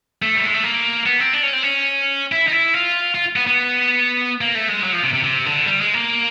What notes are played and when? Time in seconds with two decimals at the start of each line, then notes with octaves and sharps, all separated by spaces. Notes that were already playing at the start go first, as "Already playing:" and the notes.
0.22 A3
0.35 G3
0.44 G#3
0.54 A3
0.64 A#3
1.06 B3
1.20 C4
1.33 D4
1.43 C#4
1.53 C4
1.63 C#4
2.32 E4
2.48 D#4
2.52 E4
2.74 F4
3.15 F4
3.36 B3
3.47 B3
4.41 A#3
4.55 A3
4.68 G#3
4.83 F#3
4.92 F3
5.03 C3
5.13 C3
5.24 C3
5.46 D3
5.66 G3
5.81 G#3
5.94 A#3